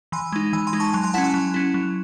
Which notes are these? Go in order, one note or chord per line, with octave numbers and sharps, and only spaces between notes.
E3 G#5 C6
G#3 D#4
E3 G#5
G#5 C6
G#3 D#4
A5 C#6
F#3 G#5 C6
G#5 C6
C#4 E4 F#5 A5
G#5 C6
F#3
C#4 E4
F#3